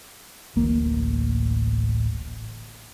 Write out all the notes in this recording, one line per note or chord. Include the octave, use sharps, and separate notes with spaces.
D1 A1 A#3